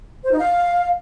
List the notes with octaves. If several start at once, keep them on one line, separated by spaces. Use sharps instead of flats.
C5
D#4
F5